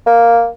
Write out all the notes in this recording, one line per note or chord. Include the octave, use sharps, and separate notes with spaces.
A#3